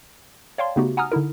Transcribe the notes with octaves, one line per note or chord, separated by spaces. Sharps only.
C#5 D5 F5 G5 A5 C6
C#3 A3 B3 D#4 F#4 G4
F#5 G#5 A#5 D#6 F6
D3 D#4 E4 A#4